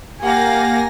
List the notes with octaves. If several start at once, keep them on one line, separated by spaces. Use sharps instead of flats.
A#3 G4 F5 F#5 G#5 A#6